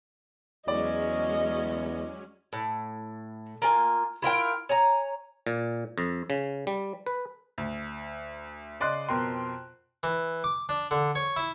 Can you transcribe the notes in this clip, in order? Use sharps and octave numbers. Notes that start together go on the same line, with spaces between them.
E2 F#3 G#3 C#4 D5 D#5
A2
A#3 F4 G#5
E4 F4 A#4 G5
C#5 G#5 A#5
A#2
F2
C#3
G3
B4
D2
C#3 D5 D#5 C6 F#6
F2 B2 A#4 G5 C6
E3
D6
D4
D3
C#5
E4